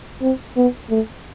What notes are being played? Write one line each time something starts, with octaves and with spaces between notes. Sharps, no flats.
C4
B3
A3